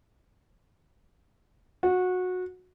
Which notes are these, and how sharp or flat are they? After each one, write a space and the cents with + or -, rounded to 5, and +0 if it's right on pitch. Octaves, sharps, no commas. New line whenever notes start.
F#4 -20